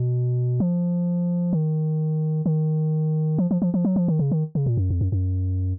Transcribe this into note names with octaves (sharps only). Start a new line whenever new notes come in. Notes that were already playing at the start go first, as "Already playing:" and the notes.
Already playing: B2
F3
D#3
D#3
F3
F3
F3
F3
F#3
F3
D#3
C#3
D#3
C#3
A#2
F#2
F2
F#2
F#2